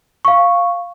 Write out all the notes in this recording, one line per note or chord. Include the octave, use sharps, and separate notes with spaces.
F5 C#6